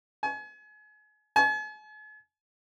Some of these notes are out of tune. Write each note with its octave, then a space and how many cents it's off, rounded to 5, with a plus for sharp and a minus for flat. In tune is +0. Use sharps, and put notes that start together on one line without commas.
G#5 +35
G#5 +45